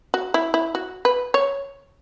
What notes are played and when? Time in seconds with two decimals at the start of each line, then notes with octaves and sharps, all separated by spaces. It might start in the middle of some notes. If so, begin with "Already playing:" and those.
0.14 F#4
0.34 E4
0.54 E4
0.75 F#4
1.05 B4
1.34 C#5